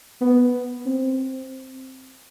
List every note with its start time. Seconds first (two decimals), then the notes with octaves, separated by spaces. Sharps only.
0.21 B3
0.86 C4